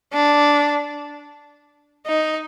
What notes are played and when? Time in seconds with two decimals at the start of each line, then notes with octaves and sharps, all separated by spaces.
0.13 D4
2.06 D#4